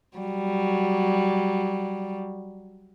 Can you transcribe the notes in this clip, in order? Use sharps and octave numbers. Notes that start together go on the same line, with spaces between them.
F#3 G3